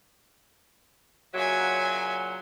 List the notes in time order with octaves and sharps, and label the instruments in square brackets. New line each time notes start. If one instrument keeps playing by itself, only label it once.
[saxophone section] A#2 C#3 F#3 [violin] E5 G#5